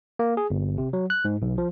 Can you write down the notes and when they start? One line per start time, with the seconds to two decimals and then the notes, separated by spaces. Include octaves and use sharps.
0.19 A#3
0.37 G#4
0.50 G1
0.78 C3
0.93 F#3
1.10 F#6
1.25 G#2
1.42 B1
1.58 F3